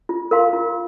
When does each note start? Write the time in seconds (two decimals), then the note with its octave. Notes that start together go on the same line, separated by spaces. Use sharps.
0.09 F4
0.31 A#4 F5 C6
0.53 F4